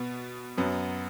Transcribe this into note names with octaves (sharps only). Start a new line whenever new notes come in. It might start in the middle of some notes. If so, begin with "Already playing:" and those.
Already playing: B2 B3
F#2 F#3 B3